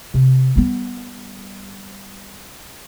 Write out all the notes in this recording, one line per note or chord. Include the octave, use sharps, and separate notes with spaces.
C3
G3 B3